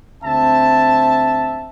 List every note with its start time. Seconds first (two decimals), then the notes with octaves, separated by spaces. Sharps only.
0.23 D2 C4 E5 A5